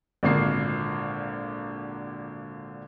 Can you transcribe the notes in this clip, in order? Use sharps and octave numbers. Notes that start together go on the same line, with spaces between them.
G#1 A#2 D3 A#3 C7